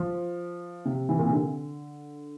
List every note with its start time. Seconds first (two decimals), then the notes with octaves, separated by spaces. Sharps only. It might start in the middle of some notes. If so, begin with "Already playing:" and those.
Already playing: F3
0.85 C3
1.09 E3
1.19 A#2
1.26 C3
1.33 D3